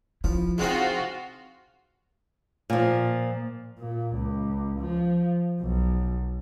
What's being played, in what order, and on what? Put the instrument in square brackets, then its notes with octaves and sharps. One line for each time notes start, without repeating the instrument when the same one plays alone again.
[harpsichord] F3 [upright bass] E4
[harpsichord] G#3 C4 D#4 [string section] F4 F#4
[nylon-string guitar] A#2 F3
[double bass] A#2
C#2
F3
B1